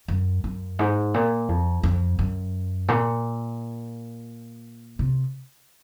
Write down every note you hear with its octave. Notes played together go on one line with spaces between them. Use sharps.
F#2
F#2
G#2
A#2
F2
F2
F#2
A#2
C3